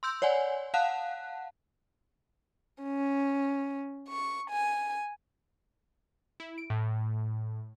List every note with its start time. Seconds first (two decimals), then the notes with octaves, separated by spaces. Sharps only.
0.03 C6 E6 G6
0.22 C#5 D5 F#5 G#5
0.74 F5 F#5 A5 F#6
2.81 C#4
4.07 C#6
4.51 G#5
6.40 E4
6.58 D7
6.70 A2